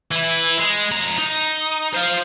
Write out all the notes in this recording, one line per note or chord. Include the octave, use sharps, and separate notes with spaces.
E3 E4
G#3
F2 A#5
D#4
C5 F5